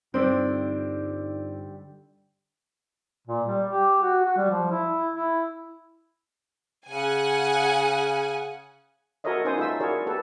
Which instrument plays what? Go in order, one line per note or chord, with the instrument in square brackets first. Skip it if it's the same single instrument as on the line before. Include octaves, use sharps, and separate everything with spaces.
[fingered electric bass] G2 [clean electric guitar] D3 G3 [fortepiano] C4 [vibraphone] D#4 F4 D5
[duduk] A#2
G3
G4
F#4
F#4
G3
F3
E4
E4
[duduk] C#3 [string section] F#5 G#5
[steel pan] F#4 A4 A#4 C#5 D#5 E5
C#4 D#4 B4 C5 G#5 D#6
D#4 F4 A4 C5 E5 E6
E4 F#4 G#4 A#4 C#5 D5
G4 A4 B4